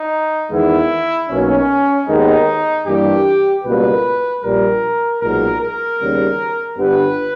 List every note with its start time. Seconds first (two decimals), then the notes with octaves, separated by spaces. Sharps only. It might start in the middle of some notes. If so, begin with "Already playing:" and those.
Already playing: D#4
0.51 E2 D#3 G#3 B3 E4
1.29 B1 B2 A#3 C#4
2.07 D#2 D#3 G#3 B3 D#4
2.86 G2 E3 A#3 G4
3.65 C#2 B2 G3 A#3 B4
4.43 A#1 A#2 G3 A#4
5.21 B1 A#2 G#3 B3 A#4
5.60 A#4
6.00 D#2 C#3 G3 B3
6.78 G1 G2 G3 B3 B4